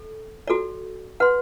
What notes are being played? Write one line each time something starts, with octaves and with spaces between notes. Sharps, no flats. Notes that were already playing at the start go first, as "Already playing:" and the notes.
Already playing: A4
F#4 A4 D5
B4 F#5 C6